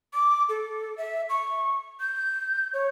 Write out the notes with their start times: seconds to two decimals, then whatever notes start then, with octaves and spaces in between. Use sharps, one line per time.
0.13 D6
0.49 A4
0.97 E5
1.29 C#6
2.00 G6
2.73 C#5